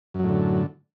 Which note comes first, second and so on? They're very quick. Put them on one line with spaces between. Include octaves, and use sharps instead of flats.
F#2 F#3 A2 D3